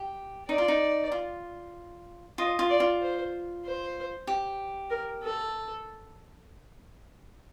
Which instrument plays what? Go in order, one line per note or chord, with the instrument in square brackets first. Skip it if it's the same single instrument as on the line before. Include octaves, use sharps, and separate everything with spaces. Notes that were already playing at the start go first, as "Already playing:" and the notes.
Already playing: [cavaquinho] G4
[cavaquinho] D#4 [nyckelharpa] D5
[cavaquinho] F4
D#4
F4
[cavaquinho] F4 [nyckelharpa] D#5
[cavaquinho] F4
[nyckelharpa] D5
[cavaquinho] F4
[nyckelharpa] C5
C5
[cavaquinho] G4
[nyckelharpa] A#4
A4